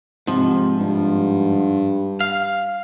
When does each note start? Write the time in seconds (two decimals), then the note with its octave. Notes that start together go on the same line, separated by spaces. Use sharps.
0.27 G#2 C3 F3
0.79 G2
2.20 F5